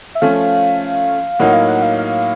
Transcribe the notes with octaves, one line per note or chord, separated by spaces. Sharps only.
E5
F3 A3 C#4 F5
A2 F#3 A#3 D#4 F#5
F5
F#5
F5
F5